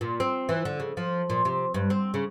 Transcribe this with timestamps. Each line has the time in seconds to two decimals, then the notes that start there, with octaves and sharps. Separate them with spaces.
0.01 A#2
0.20 C4
0.49 E3
0.65 D3
0.80 C#3
0.97 F3
1.30 A#2
1.45 C3
1.74 G2
1.90 C4
2.14 C#3